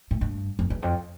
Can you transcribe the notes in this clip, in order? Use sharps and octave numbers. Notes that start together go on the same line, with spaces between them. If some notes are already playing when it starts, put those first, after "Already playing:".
A2
G2
F2
E2
F2